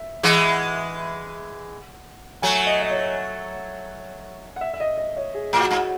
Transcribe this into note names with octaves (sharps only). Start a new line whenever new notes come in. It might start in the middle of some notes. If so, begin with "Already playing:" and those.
Already playing: E5
E3 G#3 F#5
E5
F#5
F#3 A3 G#5
D#5
D#5
C#5
F#5
E5
E5
D#5
D#5
C#5
G#4
A2
F#4
G#2